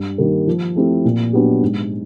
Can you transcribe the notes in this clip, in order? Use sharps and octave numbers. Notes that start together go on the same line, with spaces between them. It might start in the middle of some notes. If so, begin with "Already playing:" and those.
Already playing: G2
D#3 G3 A#3
F3
A3 C4 E4 G4
A#2
F#3 B3 D4 G4
G#2